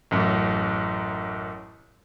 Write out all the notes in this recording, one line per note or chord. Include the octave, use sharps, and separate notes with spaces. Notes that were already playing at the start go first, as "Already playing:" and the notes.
A1 F#2